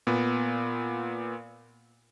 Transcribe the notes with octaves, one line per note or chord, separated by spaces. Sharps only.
A#2 B3